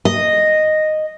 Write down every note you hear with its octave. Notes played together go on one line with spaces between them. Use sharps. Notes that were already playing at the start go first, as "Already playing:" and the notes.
D#5